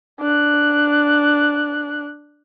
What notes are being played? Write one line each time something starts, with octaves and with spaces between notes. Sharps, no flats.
D4 F#6